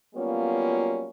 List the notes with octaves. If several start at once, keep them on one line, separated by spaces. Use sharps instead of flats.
F#3 G3 A#3 B3 C#4 F4